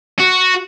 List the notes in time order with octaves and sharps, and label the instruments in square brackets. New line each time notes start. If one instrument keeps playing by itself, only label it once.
[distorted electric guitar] F#4